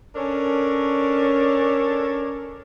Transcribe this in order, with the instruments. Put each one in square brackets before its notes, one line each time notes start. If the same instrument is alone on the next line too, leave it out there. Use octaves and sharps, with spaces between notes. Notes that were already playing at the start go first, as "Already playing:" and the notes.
[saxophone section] C#4 D4 A4 A#4 C#5